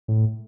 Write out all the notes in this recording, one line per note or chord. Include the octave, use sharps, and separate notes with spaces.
A2